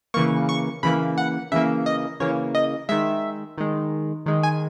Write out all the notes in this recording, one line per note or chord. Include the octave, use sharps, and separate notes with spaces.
C#3 E3 A#3 C#6
C#6
C#3 E3 A#3 B5
F#5
C#3 E3 A#3 E5
D#5
C#3 E3 A#3 C#5
D#5
D#3 G#3 E5
D#3 G#3
D#3 G#3
G#5